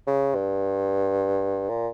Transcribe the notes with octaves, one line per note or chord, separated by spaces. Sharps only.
C#3
G2
A#2